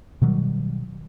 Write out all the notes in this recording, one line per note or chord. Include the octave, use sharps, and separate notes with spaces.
B2 D#3 F#3 G3